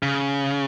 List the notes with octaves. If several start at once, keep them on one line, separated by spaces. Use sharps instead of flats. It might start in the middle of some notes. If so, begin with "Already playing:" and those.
C#3